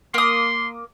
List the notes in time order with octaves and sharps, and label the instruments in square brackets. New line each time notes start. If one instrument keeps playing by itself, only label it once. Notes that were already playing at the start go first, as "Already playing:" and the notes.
[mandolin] A#3 D#6 [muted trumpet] C6